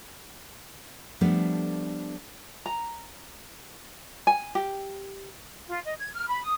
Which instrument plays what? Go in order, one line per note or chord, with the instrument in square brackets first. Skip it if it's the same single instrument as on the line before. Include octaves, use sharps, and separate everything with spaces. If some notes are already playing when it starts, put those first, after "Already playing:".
[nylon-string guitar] F3 G3 A3 B3 D4 A4
[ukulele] A#5
G#5
G4
[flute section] F4
D#5
G#6
F6
B5
D#6